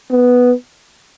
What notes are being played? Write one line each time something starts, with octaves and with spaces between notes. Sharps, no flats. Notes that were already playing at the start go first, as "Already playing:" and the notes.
B3